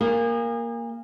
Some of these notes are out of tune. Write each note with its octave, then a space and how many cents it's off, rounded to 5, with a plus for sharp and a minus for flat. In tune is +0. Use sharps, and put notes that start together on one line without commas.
A#3 +0 G#4 -35